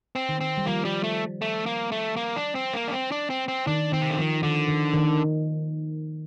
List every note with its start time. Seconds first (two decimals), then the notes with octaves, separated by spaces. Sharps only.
0.15 C4
0.29 D#3
0.41 C4
0.58 G3
0.66 F3 A#3
0.85 G3
1.04 A3
1.42 A3
1.66 A#3
1.92 A3
2.17 A#3
2.36 D4
2.55 C4
2.73 A#3
2.88 D4
2.92 C4
3.12 D4
3.30 C4
3.48 C4
3.67 D#3 D4
3.92 D#3 C4
4.02 C3
4.09 D3
4.17 D#3 F3
4.43 D3 D#3
4.68 D#3
4.94 D#3